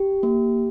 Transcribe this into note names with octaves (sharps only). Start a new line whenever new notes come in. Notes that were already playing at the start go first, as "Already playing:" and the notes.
Already playing: G4
A#3